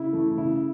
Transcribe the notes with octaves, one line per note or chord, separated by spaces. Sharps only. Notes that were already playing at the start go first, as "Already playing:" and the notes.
Already playing: C#3 E4
E3 A3
C#3 E4